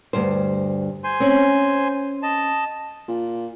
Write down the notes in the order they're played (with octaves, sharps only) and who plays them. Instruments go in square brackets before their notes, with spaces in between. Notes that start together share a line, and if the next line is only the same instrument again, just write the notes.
[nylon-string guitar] D2 G2 C5
[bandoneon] C5 G#5 C6
[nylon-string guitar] C4 C#4
[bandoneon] D#5 A5
[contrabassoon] A#2